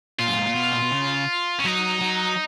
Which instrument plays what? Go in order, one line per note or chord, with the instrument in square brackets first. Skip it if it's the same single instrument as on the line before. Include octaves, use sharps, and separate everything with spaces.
[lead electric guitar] A#2 [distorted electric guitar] F4
[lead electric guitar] F#2
G#2
A#2
B2
A#2
B2
C#3
[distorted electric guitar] C#4
[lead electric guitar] F#3 [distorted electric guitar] D#4
[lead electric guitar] F#3